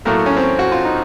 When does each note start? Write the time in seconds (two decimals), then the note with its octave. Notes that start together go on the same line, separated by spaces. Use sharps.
0.05 A2 F#3 A3 A#3
0.26 C#4
0.37 C4
0.59 F#4
0.72 F4
0.85 D#4